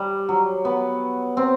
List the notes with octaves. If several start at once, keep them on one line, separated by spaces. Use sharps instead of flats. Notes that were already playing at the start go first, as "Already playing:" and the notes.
Already playing: G3
F#3
B3
C4